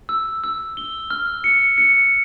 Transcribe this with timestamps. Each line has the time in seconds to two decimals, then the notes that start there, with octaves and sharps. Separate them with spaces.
0.09 E6
0.44 E6
0.77 G7
1.10 F6
1.44 C#7
1.78 C#7